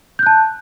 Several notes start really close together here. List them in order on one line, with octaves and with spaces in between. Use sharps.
G6 F#6 A5